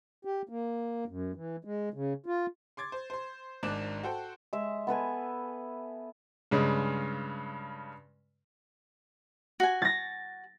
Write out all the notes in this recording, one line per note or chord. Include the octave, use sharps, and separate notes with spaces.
G4
A#3
F#2
E3
G#3
C#3
F4
C6 D6 G#6 A6
C5
C5 C6
G#1 G#2 D4 D6 F#6 E7
F#4 A4 C5 G5
G#3 E5
B3 A4 B4 G#5
G2 C#3 G#3
F#4 G#5
A6 A#6